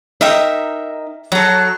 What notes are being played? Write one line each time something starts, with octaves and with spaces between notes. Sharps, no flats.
D#4 A#4 E5 G5
F#3 A4 A#5